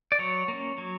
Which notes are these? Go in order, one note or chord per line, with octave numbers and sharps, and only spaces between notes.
D5
F#3 C#5
A#3 C#4
F#3